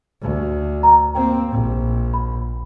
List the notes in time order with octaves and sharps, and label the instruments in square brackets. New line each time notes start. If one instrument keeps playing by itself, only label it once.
[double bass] D2
[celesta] A#5
[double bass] A#3 C4 [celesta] G5
[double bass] A#1
[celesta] B5